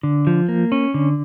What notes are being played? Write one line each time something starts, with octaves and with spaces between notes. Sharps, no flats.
D3
F3
A#3
C#4
D3